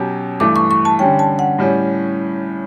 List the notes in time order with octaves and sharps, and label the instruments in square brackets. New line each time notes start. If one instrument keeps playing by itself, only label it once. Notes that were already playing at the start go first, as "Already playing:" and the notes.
Already playing: [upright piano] B2 F#3 C#4 G4
[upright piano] G2 E3 A3 [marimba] D6
[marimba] C#6
C#6
A5
[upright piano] D3 G3 C#4 [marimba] G5
[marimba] A5
F#5
[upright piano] A2 G3 C#4